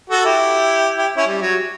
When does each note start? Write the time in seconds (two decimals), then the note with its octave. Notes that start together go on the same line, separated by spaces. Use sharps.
0.10 F#4 A4
0.25 E4 G4
0.98 E4 G4
1.17 C#4 E4
1.27 G3
1.42 F#3